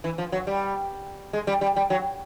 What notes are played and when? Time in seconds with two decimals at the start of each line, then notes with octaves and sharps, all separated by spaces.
0.04 E3
0.18 F3
0.32 F#3
0.47 G3
1.33 G#3
1.47 G3
1.61 G3
1.76 G3
1.90 F#3